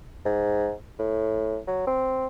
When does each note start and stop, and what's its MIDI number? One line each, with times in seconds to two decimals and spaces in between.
0.25 0.73 44
0.99 1.57 45
1.68 1.85 54
1.87 2.27 60